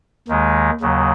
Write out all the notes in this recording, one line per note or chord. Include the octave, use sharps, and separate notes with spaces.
D#2 D#3 G#3
D#2 C#3 F#3